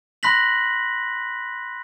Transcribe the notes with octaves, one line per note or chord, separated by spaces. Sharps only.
B5 C6 F#6 A#6 B6 F#7